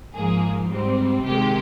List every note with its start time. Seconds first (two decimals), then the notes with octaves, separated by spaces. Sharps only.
0.13 G#2 F3 A#3 G#4
0.68 G#2 G3 C4
1.23 C3 D#3 G#3 G4